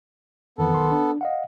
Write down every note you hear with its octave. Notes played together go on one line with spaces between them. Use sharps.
F2 D#3 E3 B3 A4
B1 D#3 C6
D4
D#5 F5 F#5